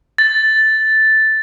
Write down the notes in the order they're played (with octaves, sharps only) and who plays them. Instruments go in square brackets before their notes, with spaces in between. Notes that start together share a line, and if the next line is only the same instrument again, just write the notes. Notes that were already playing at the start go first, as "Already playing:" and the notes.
[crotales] A6